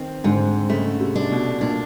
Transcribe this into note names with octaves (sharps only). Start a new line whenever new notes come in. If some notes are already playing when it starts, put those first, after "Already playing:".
Already playing: D#3 C4
G#2 D3
C#3 A3
C3
D4
B2
A#2 D4